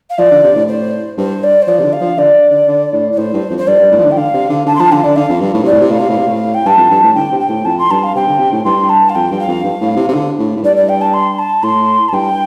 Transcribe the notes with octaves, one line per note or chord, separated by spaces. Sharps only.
F5
F3 D5
D3
C3
A2
C5
G2 C5
D5
C5
F3 D5
C3
D3
F5
F3
D3 D5
D3
D3
A2
D5
A2 C5
G2
F2
C5
G2 D5
G2
A2
F3
D3
G5
D3 F5
C3
D3
D3 A5
C6
F3 A5
D3 F5
D3 D5
D3 F5
F2
G2
A2
C3 D5
A2
C3
A2 F5
C3
A2
C3
A2
G5
G2 A5
F2
G2
A2
D3 G5
C3
G5
A2
F2 A5
C6
G2 A5
F5
C3 G5
D3
C3
A2
G2 C6
A5
F5
F2 G5
G2
F5
F2
G2
A2
C3
C3
D3
A2
A2
G2 D5
D5
G5
A5
C6
A5
A2 C6
A5
G2 G5